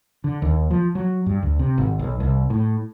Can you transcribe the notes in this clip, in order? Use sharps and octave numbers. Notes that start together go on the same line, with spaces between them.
D3
D#2
F3
F#3
G2
D2
C3
G#1
B1
C2
A2